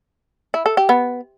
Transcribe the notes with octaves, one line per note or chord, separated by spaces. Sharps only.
E4
A4
G4
B3